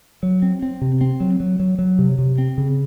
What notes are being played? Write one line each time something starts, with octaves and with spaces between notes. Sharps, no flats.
F#3
C4
C4
C3
C4
F#3
F#3
F#3
F#3
C3
C3
C4
C#3